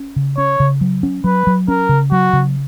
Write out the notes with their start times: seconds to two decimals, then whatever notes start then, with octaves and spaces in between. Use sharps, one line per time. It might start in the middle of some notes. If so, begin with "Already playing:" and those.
Already playing: C#4
0.16 C#3
0.37 C#4 C#5
0.60 C#3
0.81 F#3
1.03 C#4
1.24 F#3 B4
1.47 F#3
1.68 C#4 A#4
1.89 C#3
2.12 F#3 F#4
2.33 C#3